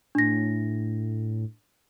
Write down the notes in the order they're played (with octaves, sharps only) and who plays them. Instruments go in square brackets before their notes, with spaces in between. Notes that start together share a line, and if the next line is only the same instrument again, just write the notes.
[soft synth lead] A2 [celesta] D4 A#6